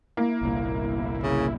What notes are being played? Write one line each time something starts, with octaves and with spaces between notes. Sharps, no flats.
A#3 E4
G1 C2 A#2
C#3